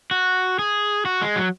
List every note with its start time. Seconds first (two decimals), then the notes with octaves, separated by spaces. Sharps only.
0.11 F#4
0.59 G#4
1.05 F#4
1.21 G#3
1.36 F#3